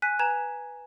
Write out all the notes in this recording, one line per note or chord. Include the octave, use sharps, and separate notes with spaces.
G#5 F#6 B6 D#7
B4 G#5 A#5 G#6 E7 F7